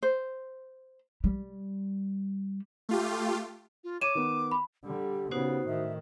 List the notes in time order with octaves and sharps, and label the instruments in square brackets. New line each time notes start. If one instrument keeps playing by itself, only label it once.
[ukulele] C5
[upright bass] G3
[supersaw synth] A3 F4 G4
[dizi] F4
[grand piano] C#5 [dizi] D6 [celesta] D#7 E7
[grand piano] D#3 B3
[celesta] B5
[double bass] D3 G3 [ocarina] G4
[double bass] C#3 B3 [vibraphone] D#4 F#4 C5
[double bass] A2 D#3 [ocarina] E5